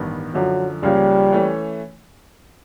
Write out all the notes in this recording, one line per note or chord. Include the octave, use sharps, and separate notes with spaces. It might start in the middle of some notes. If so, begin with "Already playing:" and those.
Already playing: A1 G2 D#3 G3 B3
F#2 D3 F3 F#3
C#2 C#3 F3 G3 A#3 C#4
E3 A3 C#4